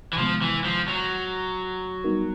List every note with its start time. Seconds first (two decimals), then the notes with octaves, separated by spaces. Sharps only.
0.13 E3
0.18 C3 D#3 F3 G#3 B3
0.42 E3
0.65 F3
0.88 F#3
2.04 G3 B3 D#4 F#4 A#4